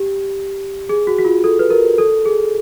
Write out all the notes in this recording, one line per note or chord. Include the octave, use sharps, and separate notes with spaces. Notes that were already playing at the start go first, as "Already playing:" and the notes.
Already playing: G4
G#4
F#4
F#4
F4
A4
B4
A#4
A4
G#4